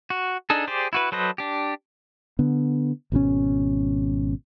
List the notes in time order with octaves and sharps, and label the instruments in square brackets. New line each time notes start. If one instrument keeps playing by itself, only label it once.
[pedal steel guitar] F#4
D4 D#4 G#4 A4
G4 G#4 C5 D5
E4 F#4 B4
F#3 A4 B4 C5 D#5
D4 G4
[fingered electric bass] D3 B3
G#1 B2 D3 C#4